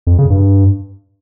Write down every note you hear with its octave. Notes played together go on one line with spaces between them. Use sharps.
F2
C#3
G2